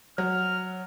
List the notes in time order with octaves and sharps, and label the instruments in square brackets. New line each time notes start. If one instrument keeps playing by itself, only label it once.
[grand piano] F#3 [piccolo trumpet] F6